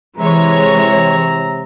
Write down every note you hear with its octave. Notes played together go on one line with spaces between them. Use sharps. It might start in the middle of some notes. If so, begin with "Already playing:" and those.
C3 E3 G#3 C#5 E5 A#5